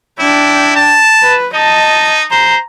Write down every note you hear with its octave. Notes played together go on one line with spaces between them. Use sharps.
D4 E4 G5
A5
B4
D#4 D#5 A5
C5 A#5